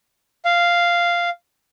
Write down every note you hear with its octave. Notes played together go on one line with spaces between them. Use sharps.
F5